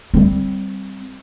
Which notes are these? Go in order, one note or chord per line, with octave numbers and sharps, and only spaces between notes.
G3 C4